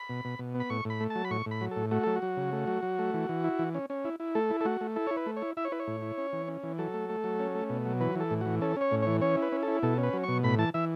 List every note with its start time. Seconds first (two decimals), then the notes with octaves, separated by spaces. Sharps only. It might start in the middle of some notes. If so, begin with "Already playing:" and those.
Already playing: B5
0.09 B2
0.25 B2
0.39 B2
0.55 B3
0.60 B5
0.70 A2 C#6
0.85 A2 B5
1.00 A3
1.10 A5
1.15 F#3
1.25 B5
1.31 A2 C#6
1.46 A2
1.51 B5
1.61 F#3
1.71 A4
1.76 A2
1.91 A3 F#4
2.03 F#3 A4
2.16 F#4
2.22 F#3
2.37 C#3
2.52 A3
2.67 F#3
2.83 F#3
2.99 A3
3.14 E3
3.29 E3
3.44 E4
3.59 E3
3.75 C#4
3.90 C#4
4.05 E4
4.20 E4
4.35 A3 A4
4.50 E4
4.61 A4
4.65 A3 F#4
4.81 A3
4.96 E4 A4
5.07 E4 C#5
5.17 B4
5.26 A3
5.36 C#5
5.42 E4
5.57 E4 E5
5.65 C#5
5.72 E4 B4
5.80 C#5
5.87 A2
6.02 E4
6.18 C#4
6.33 E3
6.48 C#4
6.63 E3
6.78 F#3 A4
6.94 A3
7.09 A3
7.24 F#3
7.39 C#4
7.55 A3
7.69 B2
7.85 F#3
8.00 E3 B4
8.15 E3 A4
8.30 A2
8.41 E3 F#4
8.61 C#4 A4
8.76 C#4 C#5
8.91 A2
9.02 E3 C#5
9.21 C#4 C#5
9.37 E4
9.42 B4
9.52 C#4
9.63 E4 A4
9.83 B2 A4
9.98 C#4
10.03 B4
10.13 F#3
10.23 B2 C#6
10.44 A2 B5
10.58 E3 A5
10.74 E3 E5